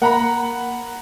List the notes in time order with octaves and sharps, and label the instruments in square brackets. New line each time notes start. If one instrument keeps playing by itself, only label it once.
[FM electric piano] A#3 [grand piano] F#5 A#5 B5